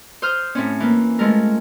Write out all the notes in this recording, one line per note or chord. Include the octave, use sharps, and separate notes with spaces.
C5 D#6 F6 G6
A2 C4 C#4
E3 A#3
F3 G#3 A3 A#4